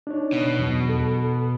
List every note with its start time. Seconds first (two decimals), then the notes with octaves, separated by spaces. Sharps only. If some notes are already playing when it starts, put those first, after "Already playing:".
0.07 D4 D#4 C#5
0.32 B2
0.59 E2 F#3
0.89 A4